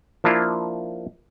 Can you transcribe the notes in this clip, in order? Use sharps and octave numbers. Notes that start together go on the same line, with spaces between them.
F3 A#3 D4 E4 F4